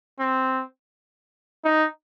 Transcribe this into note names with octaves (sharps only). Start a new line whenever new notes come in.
C4
D#4